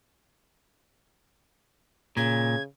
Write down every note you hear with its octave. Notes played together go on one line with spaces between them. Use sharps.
A#2 C#3 G#6